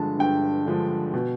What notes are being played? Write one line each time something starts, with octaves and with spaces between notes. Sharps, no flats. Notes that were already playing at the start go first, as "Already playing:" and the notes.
Already playing: G2 D3 F3 G#3 A5
G2 G5
D3 F3 G#3
B2